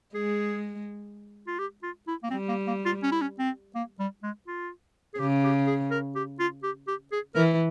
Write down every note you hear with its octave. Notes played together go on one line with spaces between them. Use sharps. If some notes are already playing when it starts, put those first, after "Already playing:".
G#3 G#4
F4
G4
F4
E4
A#3
G3 C4
A#3
A#3
F4
C#4
E4
C#4
C4
A#3
G3
G#3
F4
G#4
C#3 G4
G4
G#4
A#4
G4
F4
G4
G4
G#4
E3 A#4